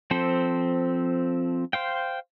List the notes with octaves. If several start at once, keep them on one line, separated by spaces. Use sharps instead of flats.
F3 C4 A4 C5
C5 F5 G5